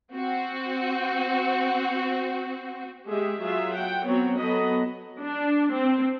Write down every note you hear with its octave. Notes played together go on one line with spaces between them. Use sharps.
C4 F#4
G#3 G4 G#4 E5
F#3 F4 G#4 E5
F#5 G5
F#3 B3 C4 C#5
F#3 B3 A4 D#5 B5
D4
C4